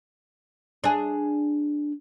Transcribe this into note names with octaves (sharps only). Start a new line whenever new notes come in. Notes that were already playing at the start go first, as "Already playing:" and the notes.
D4 G#4